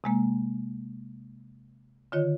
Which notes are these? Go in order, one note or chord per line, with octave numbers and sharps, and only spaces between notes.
C3 G#3 A#3
D3 D#3 F4 C#5 D#5